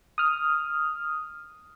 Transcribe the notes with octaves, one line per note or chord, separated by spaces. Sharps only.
D#6 F6